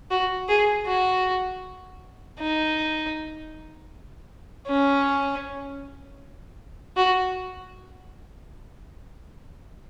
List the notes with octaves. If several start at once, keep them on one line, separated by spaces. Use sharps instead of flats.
F#4
G#4
F#4
D#4
C#4
F#4